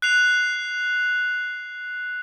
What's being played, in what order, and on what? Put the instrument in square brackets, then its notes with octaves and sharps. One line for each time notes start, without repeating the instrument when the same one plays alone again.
[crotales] F#6 C7 F7